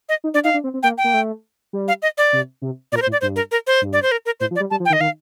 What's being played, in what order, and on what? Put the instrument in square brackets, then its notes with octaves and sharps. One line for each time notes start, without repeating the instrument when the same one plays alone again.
[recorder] D#5
[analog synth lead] D#4
[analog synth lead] D4 [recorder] D5
[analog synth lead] D#4 [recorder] F5
[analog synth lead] D4
C4
C4
[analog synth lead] A#3 [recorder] G5
[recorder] G5
[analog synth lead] A#3
A3
G3
[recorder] F5
D#5
D5
[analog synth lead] C3
C3
[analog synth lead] A#2 [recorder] D5
[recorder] A#4
C5
[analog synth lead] A2
[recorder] D5
[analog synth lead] G2 [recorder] C5
[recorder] A#4
A#4
C5
[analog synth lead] G2
[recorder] D5
C5
A#4
A#4
[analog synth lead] A2 [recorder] C5
[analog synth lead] F3
[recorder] D5
[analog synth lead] G3
[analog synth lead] G3 [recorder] A5
[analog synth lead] F3
[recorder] G5
[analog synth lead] D#3
[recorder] D#5
[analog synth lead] D#3 [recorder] F5